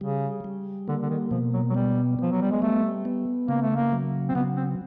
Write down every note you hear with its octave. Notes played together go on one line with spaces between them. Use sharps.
C#3 G3
G3
D3 A#3
D3
D#3
B2 F3
F#3
F#3
G3 B3
F3 B3
F#3
G3
G#3
G3 A3
B3
C#3 A#3
A3
A#3
F#3
C4
C#3 B3
C4